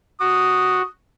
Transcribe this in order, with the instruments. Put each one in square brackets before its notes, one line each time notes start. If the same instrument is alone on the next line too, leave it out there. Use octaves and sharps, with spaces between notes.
[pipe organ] F#4 [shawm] D#6